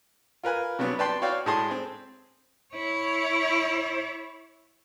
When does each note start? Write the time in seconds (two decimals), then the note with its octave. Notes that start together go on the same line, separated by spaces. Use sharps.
0.44 F4 A#4 B4 G#5
0.79 C3 F#3 G3 B3 D4
0.99 B4 D5 G5 A5 B5 C6
1.22 F#4 C#5 D5 F5 G5
1.46 A2 G#3 G#4 A5 C6 D#6
1.71 C4
2.74 E4 C#5